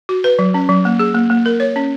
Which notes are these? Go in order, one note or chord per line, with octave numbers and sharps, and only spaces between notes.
F#4
B4
F#3
C#4
F#3
A#3
G#4
A#3
A#3
A#4
C#5
C#4